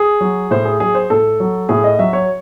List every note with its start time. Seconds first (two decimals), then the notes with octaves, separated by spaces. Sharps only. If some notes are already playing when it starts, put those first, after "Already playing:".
Already playing: G#4
0.21 F#3
0.51 A2 C5
0.65 G#4
0.80 F#3 G#4
0.95 C5
1.10 A2 A4
1.40 F#3
1.69 A2 G#4
1.84 D#5
1.99 F#3 E5
2.13 C#5